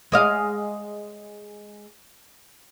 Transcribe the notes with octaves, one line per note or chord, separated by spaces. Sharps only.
G#3 D#5 F5